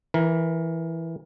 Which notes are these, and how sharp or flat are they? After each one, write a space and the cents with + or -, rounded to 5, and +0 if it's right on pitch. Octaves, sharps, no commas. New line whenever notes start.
E3 +0 A#4 +20